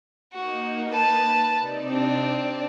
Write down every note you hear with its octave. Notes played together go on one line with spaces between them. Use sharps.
A#3 D#4 F#4
B4 A5
C3 D#4 D5
C4 D4
D5